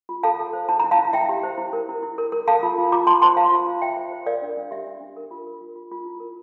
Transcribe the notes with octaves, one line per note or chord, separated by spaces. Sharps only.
F4
A4 F5 A5
A4
C5
E4 A5
E4 A#5
F5 A5
E4
E4 E5 G5
G4
C5
E4
A#4
E4
E4
A#4
A#4
A4 F5 A5
F4
F4
F4 A#5 D6
F4 A5 C6
C5 A5 C6
C5 F5 A5
F4
F4
C5 E5 G5
C5
C5
A#4 D5 F5
D4
D4
G4 E5
D4
D4
A#4
F4
A#4
F4
F4
F4
E4
A#4